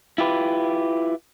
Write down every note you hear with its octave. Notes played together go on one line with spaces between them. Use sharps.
E4 F4 G4 B4